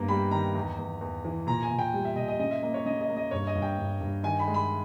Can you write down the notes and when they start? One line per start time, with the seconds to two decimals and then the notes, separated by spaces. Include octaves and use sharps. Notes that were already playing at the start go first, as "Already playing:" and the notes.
Already playing: G2 A#3 B3
0.08 G3 B5
0.31 D#3 A#5
0.55 E2
0.79 E2
1.01 E2
1.25 E3
1.47 A#2 A#5
1.63 G#5
1.71 A#2
1.79 G5
1.94 G3
2.05 E5
2.16 A#2 D#5
2.28 D#5
2.39 C#3 D#5
2.51 E5
2.63 A#3 D#5
2.74 C#5
2.86 C#3 D#5
3.01 D#5
3.09 A#3
3.17 D#5
3.31 G2 C#5
3.47 D#5
3.55 G2
3.62 G5
3.78 G2
4.01 G2
4.24 D#3 G#5
4.39 B5
4.48 G#3
4.54 B5